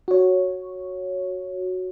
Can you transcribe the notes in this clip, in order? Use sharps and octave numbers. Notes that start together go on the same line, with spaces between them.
F#4 C#5